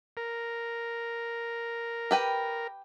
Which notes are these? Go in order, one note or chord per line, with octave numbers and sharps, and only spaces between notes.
A#4
G4 B4 G5